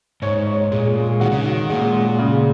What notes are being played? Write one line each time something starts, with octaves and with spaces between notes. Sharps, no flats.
G#2 C#5
C#5
A#2 G#3
G#3
D#3 F#4
C#3
D#3
F#4
A#2 G#3
G#3
C#3